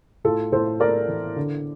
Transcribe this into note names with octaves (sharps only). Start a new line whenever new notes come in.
A2 F4 A4
A2 A4 C5
A3 A#4 D5
E3
D3